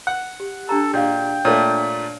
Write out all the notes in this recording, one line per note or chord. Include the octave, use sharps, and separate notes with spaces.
F#5
G4
D4 G4 A4 A#5
A#2 G#4 D#5 F5 G5
A#2 A3 D4 C#5